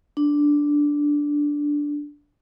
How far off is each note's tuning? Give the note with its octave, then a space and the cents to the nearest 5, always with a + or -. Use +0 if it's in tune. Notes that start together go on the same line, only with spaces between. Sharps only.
D4 -5